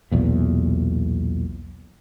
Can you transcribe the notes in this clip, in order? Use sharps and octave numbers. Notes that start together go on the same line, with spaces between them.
B1 E2 A#2